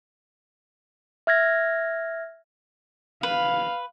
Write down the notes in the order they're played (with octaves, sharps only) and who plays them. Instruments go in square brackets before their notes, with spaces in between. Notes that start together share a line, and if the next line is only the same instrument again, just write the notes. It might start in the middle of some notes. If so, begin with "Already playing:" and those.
[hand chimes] E5 F6 G#6 A#6
[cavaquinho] B4 [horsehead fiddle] F5